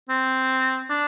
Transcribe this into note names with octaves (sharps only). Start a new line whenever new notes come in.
C4
D4